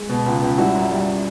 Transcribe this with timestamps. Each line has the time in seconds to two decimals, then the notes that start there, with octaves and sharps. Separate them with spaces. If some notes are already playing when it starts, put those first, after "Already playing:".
Already playing: G#3
0.09 B2
0.26 C#2
0.42 C#2
0.58 G3 E4 F#4
0.74 F#2
0.90 G3